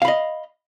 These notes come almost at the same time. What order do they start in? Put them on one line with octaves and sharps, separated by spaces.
F5 B5 D#5